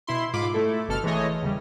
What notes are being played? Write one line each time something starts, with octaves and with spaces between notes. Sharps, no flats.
B2 E4 C6
G#2 F4 B5 D6
A3 E4 A4
G1 B2 A4 F6
E3 G#3 A3 C#5 D#5
E2 C#3 G3